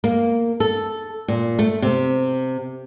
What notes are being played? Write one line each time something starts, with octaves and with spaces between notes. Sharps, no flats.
A#3
A4
A#2
A3
C3